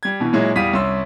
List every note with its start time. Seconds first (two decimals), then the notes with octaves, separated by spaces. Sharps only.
0.03 G3 G#6
0.20 B2 E3
0.33 A#2 F#3 G#3 E4
0.55 E2 G3 F5 D#6 B6 D#7
0.73 C2 C#4 C6 E6